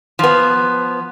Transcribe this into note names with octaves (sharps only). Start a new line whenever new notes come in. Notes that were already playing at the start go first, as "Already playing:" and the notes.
F3 B3